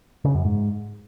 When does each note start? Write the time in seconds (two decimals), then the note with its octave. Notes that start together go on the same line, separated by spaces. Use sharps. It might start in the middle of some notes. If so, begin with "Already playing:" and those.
0.25 C#3
0.35 F#2
0.45 G#2